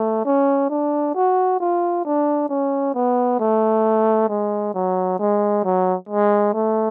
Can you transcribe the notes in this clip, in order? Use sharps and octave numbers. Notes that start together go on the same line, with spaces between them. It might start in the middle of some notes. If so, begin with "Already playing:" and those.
Already playing: A3
C#4
D4
F#4
F4
D4
C#4
B3
A3
G#3
F#3
G#3
F#3
G#3
A3